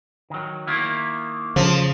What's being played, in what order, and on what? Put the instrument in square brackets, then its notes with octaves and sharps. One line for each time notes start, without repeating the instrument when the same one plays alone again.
[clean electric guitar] D#3 F#3
D#3 A#3 E4
[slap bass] C#3 [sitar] F3